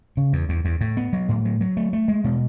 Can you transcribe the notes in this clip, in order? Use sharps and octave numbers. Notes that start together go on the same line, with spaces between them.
C#3
E2
E2
E2
A2
B3
F#3
A2
F#3
F#3
A3
A3
G#3
B2